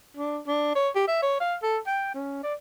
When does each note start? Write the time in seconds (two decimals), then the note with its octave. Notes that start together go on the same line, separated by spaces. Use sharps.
0.17 D4
0.47 D4
0.75 C#5
0.95 G4
1.08 E5
1.22 C#5
1.40 F5
1.63 A4
1.87 G5
2.15 C#4
2.43 D5